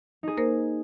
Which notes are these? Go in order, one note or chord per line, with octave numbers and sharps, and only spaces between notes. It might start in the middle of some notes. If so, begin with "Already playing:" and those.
D#4 G#4
A#3 A#4 C5